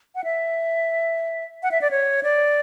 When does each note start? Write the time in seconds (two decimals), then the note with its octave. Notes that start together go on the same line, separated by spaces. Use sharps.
0.15 F#5
0.24 E5
1.63 F#5
1.71 E5
1.82 D5
1.91 C#5
2.23 D5